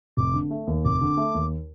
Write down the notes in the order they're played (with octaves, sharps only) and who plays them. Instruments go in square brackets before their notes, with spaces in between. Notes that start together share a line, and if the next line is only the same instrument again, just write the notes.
[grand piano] F1 [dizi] D6
[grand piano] D3
A3
D#2
[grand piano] F1 [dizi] D6
[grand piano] D3
A3
D#2